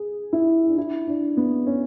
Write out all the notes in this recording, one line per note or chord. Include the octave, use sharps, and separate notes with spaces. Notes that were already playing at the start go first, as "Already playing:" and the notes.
Already playing: G#4
E4
D4
E4
D4
B3
C#4